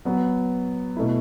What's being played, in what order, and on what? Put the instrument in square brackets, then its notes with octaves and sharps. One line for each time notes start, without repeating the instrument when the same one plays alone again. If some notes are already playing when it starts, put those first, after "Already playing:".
[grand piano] F#3 B3 F#4
B2 A3 E4